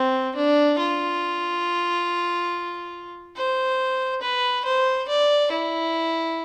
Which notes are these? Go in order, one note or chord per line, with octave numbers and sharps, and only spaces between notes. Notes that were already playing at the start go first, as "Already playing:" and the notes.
Already playing: C4
D4
F4
C5
B4
C5
D5
E4